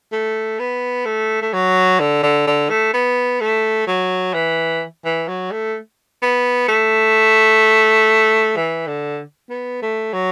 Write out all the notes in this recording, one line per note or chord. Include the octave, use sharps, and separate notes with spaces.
A3
B3
A3
A3
F#3
D3
D3
D3
A3
B3
A3
F#3
E3
E3
F#3
A3
B3
A3
E3
D3
B3
A3
F#3